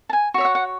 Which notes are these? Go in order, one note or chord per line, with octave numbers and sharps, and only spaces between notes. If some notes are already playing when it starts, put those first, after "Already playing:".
A5
G#5
F#4 C#5 E5 C#6
F#5
F#5